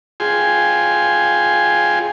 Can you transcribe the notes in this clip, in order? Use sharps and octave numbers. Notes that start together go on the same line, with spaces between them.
F4 G#4 G5 G#5 C6